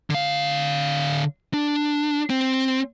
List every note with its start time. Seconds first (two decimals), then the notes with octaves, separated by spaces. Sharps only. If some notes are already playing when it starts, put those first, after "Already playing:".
0.10 D3 F5
1.54 D4
2.30 C4